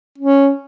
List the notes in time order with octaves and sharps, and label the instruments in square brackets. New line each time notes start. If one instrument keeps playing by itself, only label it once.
[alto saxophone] C#4